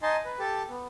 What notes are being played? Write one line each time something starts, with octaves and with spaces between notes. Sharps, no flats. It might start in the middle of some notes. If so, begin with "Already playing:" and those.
D#4 D#5 G#5 A5 C6
B4
G4 A4 A5
B3